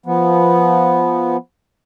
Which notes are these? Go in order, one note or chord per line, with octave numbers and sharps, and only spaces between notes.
F3 B3